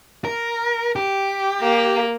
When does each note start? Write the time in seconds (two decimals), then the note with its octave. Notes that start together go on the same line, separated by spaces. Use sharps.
0.25 A#4
0.96 G4
1.61 A#3